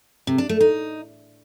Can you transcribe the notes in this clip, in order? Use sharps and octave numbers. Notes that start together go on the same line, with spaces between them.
C3
D4
A3
D#4